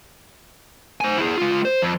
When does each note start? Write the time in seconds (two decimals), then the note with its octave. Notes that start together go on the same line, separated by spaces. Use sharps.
1.01 C5 G#5
1.18 E4 G#4
1.37 G#3 F4
1.65 C5
1.82 F2